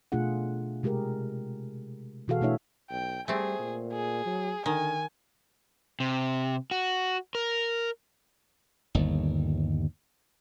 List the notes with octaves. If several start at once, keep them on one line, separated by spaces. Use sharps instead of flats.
B2 A3 D4 F4 G#4 F#5
C3 G#3 G4 G#4 A#4
B2 E3 F#4 G#4 A4 F5
B2 A3 D4 E4 C#5 E5
B1 G5
G3 A3 C4 G#4
A#2
G#4
F#3
D3 D#3 G#5
C3
F#4
A#4
G1 D#2